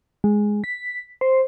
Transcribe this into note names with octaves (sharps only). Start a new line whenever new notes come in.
G#3
B6
C5